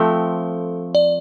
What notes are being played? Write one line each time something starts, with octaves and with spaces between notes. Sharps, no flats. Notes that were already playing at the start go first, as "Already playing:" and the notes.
Already playing: F3 A3 C4 A4
D5